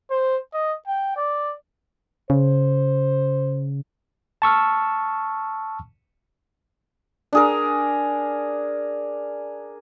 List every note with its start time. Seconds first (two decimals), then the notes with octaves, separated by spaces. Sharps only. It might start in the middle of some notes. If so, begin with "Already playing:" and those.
0.11 C5
0.54 D#5
0.87 G5
1.17 D5
2.30 C#3 C5
4.42 A5 C#6 E6 F6
7.33 D4 G#4 A#4